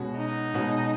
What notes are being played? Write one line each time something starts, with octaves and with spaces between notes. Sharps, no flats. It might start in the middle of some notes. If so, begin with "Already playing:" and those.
Already playing: B2 G#3 C#4 F#4
D#4
B2 G#3 C#4 F#4